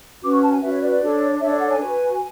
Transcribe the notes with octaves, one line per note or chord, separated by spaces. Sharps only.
C#4 F#4 B4 D6
C#6
A5
G#5
C#4 F#4 B4 E5
C#5
D5
D5
D4 A4 C#5
D4 A4 C#5 E5
D5
F#5
G#5
F#4 B4